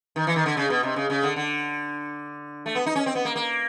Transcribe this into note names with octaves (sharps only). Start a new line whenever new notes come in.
D#3
E3
D#3
D3
C#3
B2
C3
C#3
C#3
D3
D3
A3
B3
D#4
C#4
C4
B3
A#3
A#3